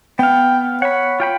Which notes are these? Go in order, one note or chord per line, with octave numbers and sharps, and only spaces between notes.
B3 F5 G5
C#5 F#5 B5
F4 G5 B5